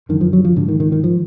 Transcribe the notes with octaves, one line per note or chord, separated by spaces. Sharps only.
F#2 D3 D#3
F3
F#3
F3
G#2 D3
D#3
D#3
D#3
F3